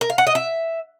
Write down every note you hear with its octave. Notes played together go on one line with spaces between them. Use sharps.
A#4
F5
F#5
D#5
E5